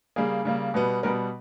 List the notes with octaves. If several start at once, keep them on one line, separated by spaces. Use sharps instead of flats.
C#3 G3 A#3 G#4
C#3 G3 A#3
B2 G3 B3
B2 G3 B3 A#4